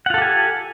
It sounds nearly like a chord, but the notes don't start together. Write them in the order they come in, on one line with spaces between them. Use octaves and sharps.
F#5 F4 A4 G4 G#5